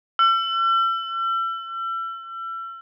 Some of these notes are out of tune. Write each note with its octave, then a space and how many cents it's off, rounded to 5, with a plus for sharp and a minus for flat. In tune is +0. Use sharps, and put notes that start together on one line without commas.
E6 +40